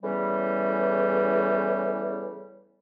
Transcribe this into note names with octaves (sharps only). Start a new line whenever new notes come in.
E2 A2 C#3 E3 G3